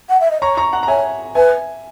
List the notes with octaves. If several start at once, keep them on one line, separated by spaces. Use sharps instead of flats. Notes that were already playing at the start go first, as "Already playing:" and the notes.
F#5
E5
D#5
C#5 A#5 C#6
A#5 C#6
F#5 A#5
A#5
C#5 E5 G#5
B4 E5 G#5